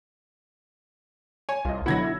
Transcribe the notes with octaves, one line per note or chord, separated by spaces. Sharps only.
C#5 G#5
C2 F4 D#5
B2 D3 F#3 E4 F#5 G#6 A#6
E6